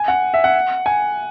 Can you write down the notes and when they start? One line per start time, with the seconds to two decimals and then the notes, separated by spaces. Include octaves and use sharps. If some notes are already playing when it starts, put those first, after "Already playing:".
Already playing: G#5
0.08 F#5
0.34 E5
0.44 F#5
0.86 G#5